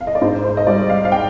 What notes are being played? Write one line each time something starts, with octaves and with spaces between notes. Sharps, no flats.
F5
D#5
D5
G#2 C5
C5
D#5
G3 D5
F5
F5
G5